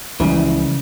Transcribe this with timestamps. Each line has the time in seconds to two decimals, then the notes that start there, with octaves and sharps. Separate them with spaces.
0.20 C#2 C#3 E3 F3 G3 E4